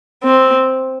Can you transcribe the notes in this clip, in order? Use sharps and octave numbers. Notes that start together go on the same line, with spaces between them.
C4